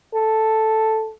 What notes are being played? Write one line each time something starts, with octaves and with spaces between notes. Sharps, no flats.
A4